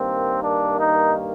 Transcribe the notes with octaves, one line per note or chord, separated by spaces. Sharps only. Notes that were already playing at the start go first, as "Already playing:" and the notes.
Already playing: G2 D#3 A#3 C4
D4
D#4